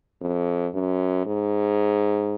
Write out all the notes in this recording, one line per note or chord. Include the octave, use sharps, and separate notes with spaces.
F2
F#2
G#2